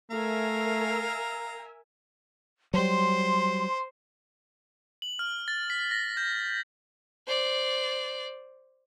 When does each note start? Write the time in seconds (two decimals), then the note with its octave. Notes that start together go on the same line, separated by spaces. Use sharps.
0.11 A3 A#4 E5 F5 G#5 A#5
2.74 F#3 G3 C5 C6
5.02 F#7
5.19 F6
5.48 A6
5.70 B6
5.91 A#6
6.17 G6
7.27 C5 D5